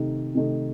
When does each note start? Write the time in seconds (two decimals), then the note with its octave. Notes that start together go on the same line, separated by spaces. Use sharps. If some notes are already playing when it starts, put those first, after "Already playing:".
Already playing: C3 D#3 A3 D#4
0.35 C3 D#3 A3 D#4